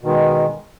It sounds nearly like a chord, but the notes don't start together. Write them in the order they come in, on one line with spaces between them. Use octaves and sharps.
B2 D#3 G#3